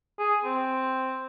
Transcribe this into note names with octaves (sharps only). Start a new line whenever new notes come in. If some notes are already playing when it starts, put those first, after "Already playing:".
G#4
C4